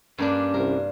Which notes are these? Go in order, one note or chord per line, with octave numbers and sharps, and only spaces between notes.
G2 A#3 C#4 D4
C2 A#4